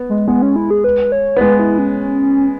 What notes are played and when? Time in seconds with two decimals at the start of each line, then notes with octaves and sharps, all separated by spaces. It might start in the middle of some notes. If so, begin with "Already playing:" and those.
Already playing: B3
0.09 G#3
0.28 G#3 B3
0.42 C#4
0.56 E4
0.71 G#4
0.84 B4
1.12 C#5
1.37 B3
1.40 G#3 B4
1.59 E4
1.78 C#4